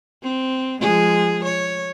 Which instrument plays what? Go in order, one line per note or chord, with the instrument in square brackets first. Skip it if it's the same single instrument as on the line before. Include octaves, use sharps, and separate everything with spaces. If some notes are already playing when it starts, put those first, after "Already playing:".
[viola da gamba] C4
F3 G#3 G#4
C#5